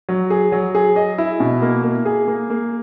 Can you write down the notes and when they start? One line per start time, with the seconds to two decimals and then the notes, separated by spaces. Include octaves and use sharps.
0.09 F#3
0.30 G#4
0.52 F#3
0.75 G#4
0.96 D#5
1.18 E4
1.40 B2
1.62 A#3
1.84 A#3
2.05 G#4
2.28 A#3
2.50 A#3